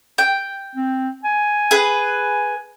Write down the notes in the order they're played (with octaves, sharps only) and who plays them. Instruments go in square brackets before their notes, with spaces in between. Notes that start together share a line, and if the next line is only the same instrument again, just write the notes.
[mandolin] G5
[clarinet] C4
G#5
[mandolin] G#4 B4